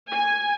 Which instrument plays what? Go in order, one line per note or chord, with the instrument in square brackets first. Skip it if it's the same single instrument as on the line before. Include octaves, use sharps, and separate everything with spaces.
[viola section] G#5